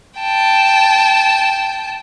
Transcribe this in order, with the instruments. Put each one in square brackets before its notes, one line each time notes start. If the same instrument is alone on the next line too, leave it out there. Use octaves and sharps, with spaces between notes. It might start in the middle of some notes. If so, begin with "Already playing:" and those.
[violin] G5 A5